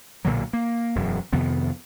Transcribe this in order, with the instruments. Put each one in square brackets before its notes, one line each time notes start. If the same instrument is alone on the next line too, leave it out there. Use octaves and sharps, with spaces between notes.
[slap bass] B1 A#2 D3 F#3
A#3
E1 F#2
F2 C3 D#3 B3